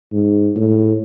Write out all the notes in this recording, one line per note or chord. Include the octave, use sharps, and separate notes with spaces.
G#2
A2